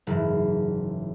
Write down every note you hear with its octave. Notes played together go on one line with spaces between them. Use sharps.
F#1 G#2 E3